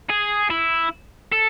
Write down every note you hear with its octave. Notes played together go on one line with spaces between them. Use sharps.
G#4
E4
A4